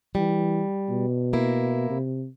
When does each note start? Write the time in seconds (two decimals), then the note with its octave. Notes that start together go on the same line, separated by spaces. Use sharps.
0.15 E3 G3
0.90 B2
1.33 A#3 E4
1.90 C3